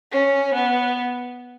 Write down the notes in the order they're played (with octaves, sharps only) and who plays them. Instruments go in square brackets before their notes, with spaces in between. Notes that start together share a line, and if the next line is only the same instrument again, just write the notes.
[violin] C#4
B3